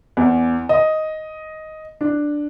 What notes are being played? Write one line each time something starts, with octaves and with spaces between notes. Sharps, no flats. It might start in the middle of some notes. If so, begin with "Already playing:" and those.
E2
D#5
D4